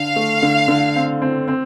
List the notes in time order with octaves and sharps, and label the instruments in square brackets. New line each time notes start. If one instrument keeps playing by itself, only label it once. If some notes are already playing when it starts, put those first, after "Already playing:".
Already playing: [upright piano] D3 [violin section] F5
[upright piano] A3
D3
D3
C4
C4
C4